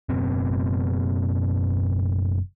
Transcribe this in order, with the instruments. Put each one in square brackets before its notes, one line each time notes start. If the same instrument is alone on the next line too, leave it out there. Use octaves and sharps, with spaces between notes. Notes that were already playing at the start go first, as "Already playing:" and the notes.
[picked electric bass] F#1 F#2 B2 C4